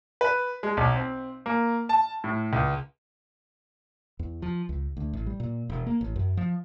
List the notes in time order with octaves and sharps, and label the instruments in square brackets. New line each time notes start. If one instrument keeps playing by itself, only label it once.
[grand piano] B4
G#3
B1
C4
A#3
A5
A2
C#2
[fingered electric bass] E2
F3
C#2
D2
A1
G3
A#2
E1
A#3
A1
F#2
F3